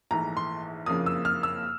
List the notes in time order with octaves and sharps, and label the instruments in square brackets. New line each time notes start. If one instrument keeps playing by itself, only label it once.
[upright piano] A#1 G#2 E3 A3 A#5
C6
F#1 F2 C#3 F3 A#3 D#6
E6
F6
E6